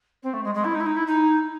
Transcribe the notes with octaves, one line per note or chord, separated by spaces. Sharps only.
C4
A3
G#3
G#3
E4
D#4
E4
D#4
E4
D#4